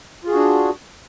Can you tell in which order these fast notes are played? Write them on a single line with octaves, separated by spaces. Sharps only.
F4 G#4 F#4 D4